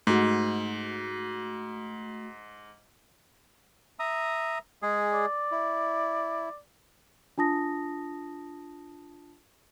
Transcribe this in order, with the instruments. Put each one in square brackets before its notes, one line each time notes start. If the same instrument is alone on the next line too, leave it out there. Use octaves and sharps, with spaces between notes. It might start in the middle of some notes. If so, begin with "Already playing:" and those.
[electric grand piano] G#2 [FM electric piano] A3 F#4
[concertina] E5 A#5 D#6
G#3 G#4
[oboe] D5
[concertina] E4
[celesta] D4 F4 A5 D#6 A#6